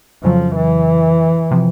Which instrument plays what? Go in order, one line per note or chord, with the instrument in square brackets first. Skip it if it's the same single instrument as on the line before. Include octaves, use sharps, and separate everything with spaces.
[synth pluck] F2 C#3 F#3 [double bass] F3
[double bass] E3
[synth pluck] C3 F3